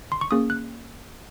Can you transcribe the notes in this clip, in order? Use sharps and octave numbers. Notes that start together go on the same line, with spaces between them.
C6
C#6
A#3 C#4 G#4 D#6
F#6